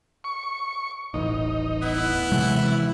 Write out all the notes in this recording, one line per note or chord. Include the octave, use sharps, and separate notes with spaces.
C#6
D#1 A1 D#4
B3 E4
C3 E3 F#3 G#3